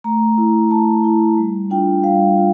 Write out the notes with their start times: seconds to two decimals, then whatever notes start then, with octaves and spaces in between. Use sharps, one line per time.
0.04 A3 A#5
0.38 E4
0.71 A3 A5
1.04 E4
1.37 G3
1.70 D4 F4 G5
2.04 G3 F5
2.37 F4